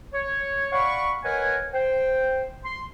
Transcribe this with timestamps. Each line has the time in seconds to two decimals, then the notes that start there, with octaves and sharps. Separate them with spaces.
0.13 C#5
0.72 D5 F5 F#5 B5 C#6
1.24 A#4 B4 C#5 D#5 F#5 G#5
1.74 C5 G5
2.64 C6